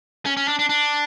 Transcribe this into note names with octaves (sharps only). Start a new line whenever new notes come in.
C#4
C#4
D4
D4
D4